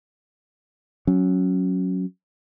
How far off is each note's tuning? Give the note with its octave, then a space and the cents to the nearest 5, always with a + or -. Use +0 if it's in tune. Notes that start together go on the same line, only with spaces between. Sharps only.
F#3 +0 C#4 +0